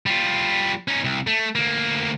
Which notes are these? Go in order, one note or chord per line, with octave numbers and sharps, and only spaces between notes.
G3 F4
C#4 D#4
C2
A3
D2 A#3